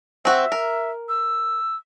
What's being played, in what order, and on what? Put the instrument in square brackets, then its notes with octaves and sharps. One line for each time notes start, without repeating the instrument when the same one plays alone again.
[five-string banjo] C4 F#4 [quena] E5
[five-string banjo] A#4
[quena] E6